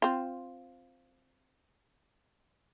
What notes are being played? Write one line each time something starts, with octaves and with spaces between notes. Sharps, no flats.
C4 F4